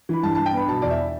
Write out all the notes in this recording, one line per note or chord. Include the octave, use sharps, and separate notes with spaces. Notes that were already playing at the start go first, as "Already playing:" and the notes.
E3 B5
G2 A5
G2 A5
G5
B3 B5
B2 A5
E2 D5
E5